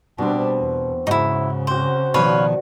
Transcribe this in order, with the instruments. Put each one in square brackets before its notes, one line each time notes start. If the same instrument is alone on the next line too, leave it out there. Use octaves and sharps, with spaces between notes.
[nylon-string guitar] B2 [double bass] G3 D4 [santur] C4 F#4
[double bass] E2
[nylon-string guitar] G#2 [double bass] C#3 [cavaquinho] D#4 E4 [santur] F#4
[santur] C4 F#4 [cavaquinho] C5
[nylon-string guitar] B2 D#3 F3 [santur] F#4 D5 [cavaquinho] B4 C#5 F5